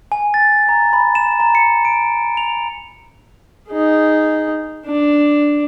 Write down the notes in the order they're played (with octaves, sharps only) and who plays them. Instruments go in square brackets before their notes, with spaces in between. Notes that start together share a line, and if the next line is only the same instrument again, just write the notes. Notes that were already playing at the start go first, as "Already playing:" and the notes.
[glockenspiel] G#5
A6
A#5
B5
E7
A#5
C#7
D7
F7
[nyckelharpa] D#4 G#4
D4